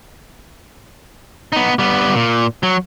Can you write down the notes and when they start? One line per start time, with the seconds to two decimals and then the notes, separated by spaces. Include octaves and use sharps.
1.52 B3 D#4
1.79 G3 B3
2.15 A#2
2.63 F#3